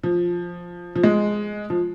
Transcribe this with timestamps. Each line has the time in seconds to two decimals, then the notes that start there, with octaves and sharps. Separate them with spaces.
0.03 F3
0.95 F3
1.04 G#3
1.70 F3